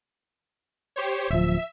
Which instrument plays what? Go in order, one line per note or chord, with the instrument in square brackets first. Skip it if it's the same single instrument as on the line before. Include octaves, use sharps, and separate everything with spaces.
[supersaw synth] G4 C5 C#5
[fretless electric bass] D1 F3 [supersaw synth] E5